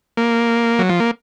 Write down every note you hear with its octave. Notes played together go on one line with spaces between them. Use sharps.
A#3
F#3
F3
A#3